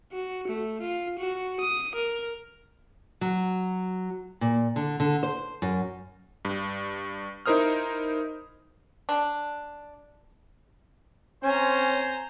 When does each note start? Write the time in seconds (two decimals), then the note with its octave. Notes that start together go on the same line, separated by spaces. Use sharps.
0.13 F#4
0.48 A3
0.81 F4
1.19 F#4
1.60 D#6
1.95 A#4
3.21 F#3
4.41 A#2
4.76 D3
5.00 D3
5.23 C5
5.62 F#2
6.45 G2
7.46 D#4 E4 A#4 C5 D#6 F6
9.09 D4
11.43 C4 C#4 C5 G#5 A#5